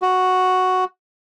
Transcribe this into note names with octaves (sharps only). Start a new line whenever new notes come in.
F#4